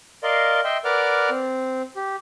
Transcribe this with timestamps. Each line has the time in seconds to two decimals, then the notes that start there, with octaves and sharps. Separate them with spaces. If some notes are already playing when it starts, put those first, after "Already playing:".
0.23 A#4 D5 D#5 F5 C6
0.64 D#5 E5 G5 C6
0.85 A#4 B4 D5 F#5 D6 F6
1.30 C4
1.96 G4